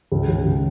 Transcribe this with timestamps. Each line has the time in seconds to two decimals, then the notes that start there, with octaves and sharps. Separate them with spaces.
0.12 C#2
0.28 C#3
0.45 C#3